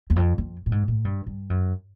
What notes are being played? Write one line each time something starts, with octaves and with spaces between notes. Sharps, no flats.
E2
F2
F2
A2
G#2
A2
G2
G2
F#2